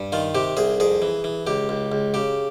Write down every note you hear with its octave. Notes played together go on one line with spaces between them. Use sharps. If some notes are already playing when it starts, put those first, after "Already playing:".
Already playing: G2
D#3 F4
C3 G4
C2 G#4
F2 G#4
E3
E3
C#2 G4
C#2
C#2
C#3 G4